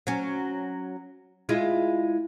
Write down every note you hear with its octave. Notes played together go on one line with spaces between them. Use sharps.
F#3 C#4
G#3 E4 F4